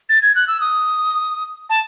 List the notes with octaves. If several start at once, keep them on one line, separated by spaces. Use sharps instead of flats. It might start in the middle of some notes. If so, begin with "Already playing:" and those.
A6
G#6
F#6
E6
D#6
A5